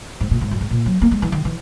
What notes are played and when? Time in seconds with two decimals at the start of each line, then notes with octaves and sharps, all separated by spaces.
0.21 G#2
0.31 A#2
0.41 G#2
0.51 F#2
0.61 G#2
0.71 A#2
0.86 F#3
1.02 A#3
1.11 G#3
1.22 E3
1.32 D#3
1.45 E3